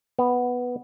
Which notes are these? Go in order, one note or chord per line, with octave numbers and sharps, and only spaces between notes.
B3